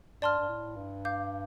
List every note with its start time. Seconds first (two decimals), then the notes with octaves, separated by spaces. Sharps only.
0.21 G2 D5 A5 C6 F6
0.39 G2
0.49 A2
0.76 G2
1.05 F5 D6 G6